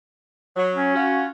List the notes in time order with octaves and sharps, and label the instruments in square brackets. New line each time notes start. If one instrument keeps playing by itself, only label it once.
[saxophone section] F#3
[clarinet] C#4
[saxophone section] F4 F#4